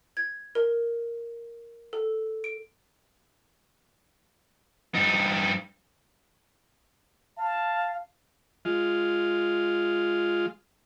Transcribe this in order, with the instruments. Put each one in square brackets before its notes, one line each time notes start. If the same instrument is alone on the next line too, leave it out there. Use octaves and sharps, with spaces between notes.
[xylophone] G#6
A#4
A4
D7
[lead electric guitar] G2 D#4
[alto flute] F5 [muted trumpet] A5
[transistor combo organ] G#3 F4